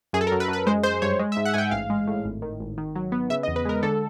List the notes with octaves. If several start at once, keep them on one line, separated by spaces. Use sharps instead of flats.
F#2 G#4
A4
A#4
F#2
B4
F#2
B4
G#3 C5
G#3 C5
G2 C#5
G#3
E5
G#2
F#5
G#2 G5 G#5
A1 F5
G#3
A2
G#1
D#3
G#1
D#3
F#3
B3
C#3 E5
D#5
E2
B4
G#3 A#4
D3 A4